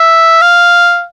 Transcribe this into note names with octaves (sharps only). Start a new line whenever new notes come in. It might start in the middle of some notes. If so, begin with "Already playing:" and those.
Already playing: E5
F5